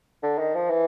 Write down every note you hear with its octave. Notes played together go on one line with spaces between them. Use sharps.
D3
D#3
F3
E3